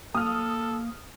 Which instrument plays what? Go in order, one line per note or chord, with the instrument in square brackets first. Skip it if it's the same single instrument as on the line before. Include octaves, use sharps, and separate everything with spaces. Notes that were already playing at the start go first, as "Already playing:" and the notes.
[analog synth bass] A#3 [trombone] A4 [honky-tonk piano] D#6 F6